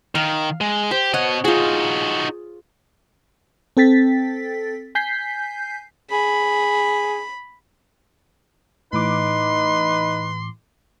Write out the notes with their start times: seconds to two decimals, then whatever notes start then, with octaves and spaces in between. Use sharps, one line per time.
0.15 D#3 F5
0.61 G#3
0.91 G4 C5
1.14 B2 C#5 D#5 F#5
1.45 D#4 F4 F#4 G#4
3.77 C4 A4 G5 A6 B6
4.95 G#5 G6 B6 C7
6.11 G#4 B5
8.93 A2 E3 D#4 B4 C6 D6